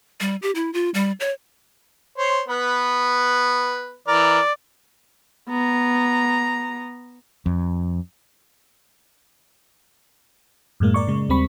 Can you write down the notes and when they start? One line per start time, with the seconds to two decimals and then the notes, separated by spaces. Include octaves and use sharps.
0.21 G3
0.42 G4
0.55 E4
0.74 F4
0.94 G3
1.20 C#5
2.18 C5 C#5
2.48 B3 B4
4.07 E3 A#4 D5
5.49 B3 A#5
7.46 F2
10.80 F#2 A2 G#3 A#3
10.94 A#4 D5 C#6
11.07 C#3 G#3
11.29 D#2 G3 C4 B5 C#6